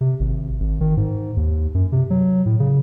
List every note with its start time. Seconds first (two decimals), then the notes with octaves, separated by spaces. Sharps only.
0.01 C3
0.20 G#1
0.60 G#1
0.81 D#3
0.97 G#2
1.37 D#2
1.74 F#2
1.92 C3
2.10 F#3
2.46 A2
2.60 C#3